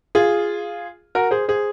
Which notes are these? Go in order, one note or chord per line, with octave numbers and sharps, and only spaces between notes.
F4 G#4
F#4 A#4
G#4 C5
G#4 C5